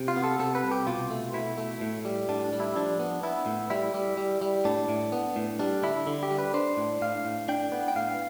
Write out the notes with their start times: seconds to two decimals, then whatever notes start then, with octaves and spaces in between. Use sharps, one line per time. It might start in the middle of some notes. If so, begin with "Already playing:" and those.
Already playing: C3
0.08 F4
0.16 B3
0.24 A4
0.39 C3 A4
0.55 B4
0.63 C2
0.71 G4
0.87 B2 F4
1.10 A3
1.33 B2 E4
1.58 A3
1.81 A2
2.05 G3
2.29 A2 D4
2.44 D4
2.53 G3
2.60 E4
2.76 F3 D4
2.99 B3
3.23 B3 E4
3.46 A2
3.70 G3 E4
3.94 G3
4.17 G3
4.42 G3
4.65 A2 D4
4.89 A2
5.12 B3
5.36 A2
5.59 G3 D4
5.83 D3 E4
6.07 D3
6.23 G4
6.31 G3
6.39 B4
6.54 D4 C5
6.77 A2
7.01 A2 F5
7.25 A2
7.48 D4 G5
7.72 B3
7.88 G5
7.95 A2 F5